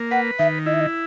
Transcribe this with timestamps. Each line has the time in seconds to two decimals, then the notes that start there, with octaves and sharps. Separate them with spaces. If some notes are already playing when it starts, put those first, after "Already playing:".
Already playing: A#3
0.11 B4 F#5
0.39 D#3 E5
0.66 E4 D#5
0.74 E5
0.81 D#5